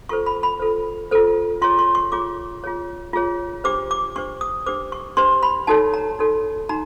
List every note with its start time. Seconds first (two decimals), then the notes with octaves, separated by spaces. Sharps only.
0.09 F4 A4 C5 C#6
0.26 B5
0.43 B5
0.60 F4 A4 C5
1.11 F4 A4 C5
1.62 F4 G#4 C#5 C6
1.79 C6
1.95 C#6
2.12 F4 G#4 C#5 D6
2.64 F4 G#4 C#5
3.13 F4 G#4 C#5
3.64 D4 G4 C5 D6
3.91 D6
4.16 D4 G4 C5 C#6
4.41 D#6
4.66 D4 G4 C5 D6
4.92 C#6
5.17 D4 G4 C5 C6
5.43 B5
5.67 D#4 F#4 A4 C#5 A5
5.94 A#5
6.19 D#4 F#4 A4 C#5
6.69 D#4 F#4 A#5